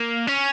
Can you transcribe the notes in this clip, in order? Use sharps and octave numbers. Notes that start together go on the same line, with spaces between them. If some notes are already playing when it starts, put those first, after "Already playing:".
Already playing: A#3
C#4